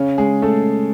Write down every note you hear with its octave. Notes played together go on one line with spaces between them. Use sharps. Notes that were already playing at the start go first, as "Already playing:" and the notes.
Already playing: C#3 C#4
G#3 G#4
A3 A4